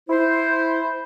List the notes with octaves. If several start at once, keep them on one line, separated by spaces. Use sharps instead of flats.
E4 C5